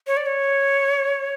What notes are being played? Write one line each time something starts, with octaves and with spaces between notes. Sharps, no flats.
C#5
D5
C#5